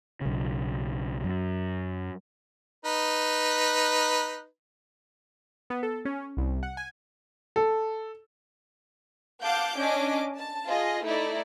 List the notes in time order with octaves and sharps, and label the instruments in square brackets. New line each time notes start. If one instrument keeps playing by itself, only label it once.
[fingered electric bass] B1 C#3
F#2
[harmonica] D#4 B4
[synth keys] B3
A4
C#4
C2
F#5
G#5
[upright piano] A4
[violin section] F5 F#5 A5 D6 G6
C#4 D4 D#5 D6
A5
F4 G#4 D#5
A3 D#4 E4 D5